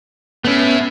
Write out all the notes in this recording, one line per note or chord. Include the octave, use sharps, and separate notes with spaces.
A3 B3 C#4 E4